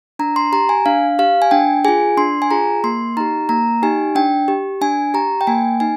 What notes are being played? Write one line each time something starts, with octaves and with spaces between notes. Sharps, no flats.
D4 A#5
C6
G4 A#5
G#5
D4 F5
G4 F5
G#5
D4 G5
F4 G#4 G#5
D4 C6
G#5
F4 G#4 A#5
A#3 C6
D#4 G4 A#5
A#3 A#5
D#4 G4 G#5
D4 G5
G4
D4 G#5
G4 A#5
G5
A#3 G#5
D#4 G#5